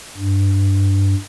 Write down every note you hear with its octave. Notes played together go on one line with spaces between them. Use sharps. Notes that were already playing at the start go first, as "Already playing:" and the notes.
G2